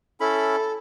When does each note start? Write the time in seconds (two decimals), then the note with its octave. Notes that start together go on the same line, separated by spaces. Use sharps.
0.20 C#4 E4 A4 B5